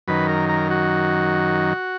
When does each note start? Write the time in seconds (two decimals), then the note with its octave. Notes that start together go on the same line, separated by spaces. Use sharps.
0.08 F#2 D#3 B4
0.29 A#4
0.49 A#4
0.70 F#4